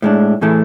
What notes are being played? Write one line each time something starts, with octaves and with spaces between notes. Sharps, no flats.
A2 G#3 D4
A2 E3 A3 E4 G#4